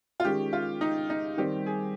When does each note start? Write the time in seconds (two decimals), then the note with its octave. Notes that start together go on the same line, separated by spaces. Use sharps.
0.20 F4
0.25 D#3 G#3 C#4 G4
0.53 F4
0.81 D#4
1.10 D#4
1.37 D#3 G3 C4 G4
1.66 G#4